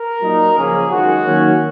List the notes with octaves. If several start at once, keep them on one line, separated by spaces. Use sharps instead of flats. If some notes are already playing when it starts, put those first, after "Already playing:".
Already playing: A#4
A#2 F#3 A#3 D#4
C#3 F3 A#3 C#4 G#4
F#2 D#3 G#3 F#4
D#3 F#3 A#3 C#4